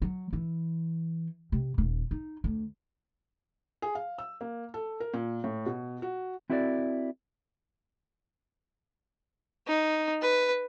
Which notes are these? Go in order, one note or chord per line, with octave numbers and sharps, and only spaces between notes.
F#3
E3
C3
D#1
D#4
D2
G#4
F5
E6
A#3
A4
A#4
A#2
A2
B2
F#4
C4 E4 F#4 A4 A#4 D5
D#4
B4